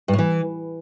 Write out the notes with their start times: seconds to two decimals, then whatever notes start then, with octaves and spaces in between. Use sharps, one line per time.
0.08 G2
0.13 A2
0.19 E3